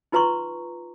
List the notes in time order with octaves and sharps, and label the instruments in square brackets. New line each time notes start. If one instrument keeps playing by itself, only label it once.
[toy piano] D#4 F4 B4 A#5 C6 C#6